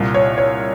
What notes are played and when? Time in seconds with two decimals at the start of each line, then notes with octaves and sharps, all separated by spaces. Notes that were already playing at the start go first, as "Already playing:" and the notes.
Already playing: C2 A#2
0.14 C#5
0.38 C#5